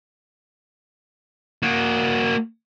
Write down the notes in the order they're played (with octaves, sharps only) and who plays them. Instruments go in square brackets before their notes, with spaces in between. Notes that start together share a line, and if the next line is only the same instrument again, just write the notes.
[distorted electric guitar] A#3 F#4